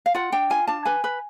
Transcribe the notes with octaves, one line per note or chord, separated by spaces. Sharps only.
F5
F4 F#5
D4 G5
F4 G#5
D4 A5
B4 G#5
B4